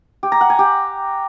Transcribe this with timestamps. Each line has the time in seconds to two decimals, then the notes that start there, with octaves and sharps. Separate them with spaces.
0.23 G4
0.32 A#5
0.41 F#5
0.50 G#5
0.59 G4